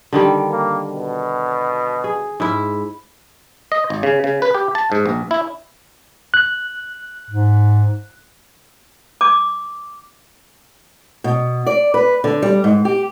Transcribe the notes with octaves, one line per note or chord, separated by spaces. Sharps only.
D3 D#3 G3
A#3
B2
G#4
G#2 E4
D#5
G#1
C#3
C#3
B4
G4
A5
G#2
A#1
E4
F#6
G#2
D6
B2
D5
B4
D3
G3
G#2
G4